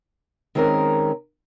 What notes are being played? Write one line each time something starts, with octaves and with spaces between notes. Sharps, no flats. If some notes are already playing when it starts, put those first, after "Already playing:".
D#3 G#3 C4 C#4 F#4 A#4